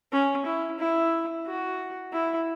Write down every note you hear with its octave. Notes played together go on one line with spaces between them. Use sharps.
C#4
E4
E4
F#4
E4